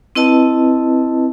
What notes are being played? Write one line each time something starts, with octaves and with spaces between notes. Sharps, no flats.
C4 E4 B4 D#5 A5